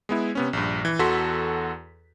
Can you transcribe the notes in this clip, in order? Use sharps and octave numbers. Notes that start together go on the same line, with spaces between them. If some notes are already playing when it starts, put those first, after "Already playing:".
G#3 B3 E4
C3 B3 C#4
A#1 G2
E3
E2 F#4 A4 C6 B6